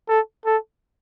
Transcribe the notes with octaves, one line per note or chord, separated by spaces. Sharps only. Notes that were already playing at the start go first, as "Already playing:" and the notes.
A4
A4